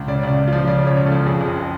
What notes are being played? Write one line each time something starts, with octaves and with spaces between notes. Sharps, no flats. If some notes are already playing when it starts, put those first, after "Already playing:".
Already playing: C#2
C#3 D5
C#2 D5
C#2
F4
F3
C#3 D5
C#2
C#5
C#2
A4
F3
F2 G#4
F#1